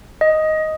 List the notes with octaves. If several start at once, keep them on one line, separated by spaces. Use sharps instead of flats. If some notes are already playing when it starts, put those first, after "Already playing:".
D#5